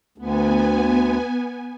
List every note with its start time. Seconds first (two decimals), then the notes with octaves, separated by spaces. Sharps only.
0.18 D2 B3 G#5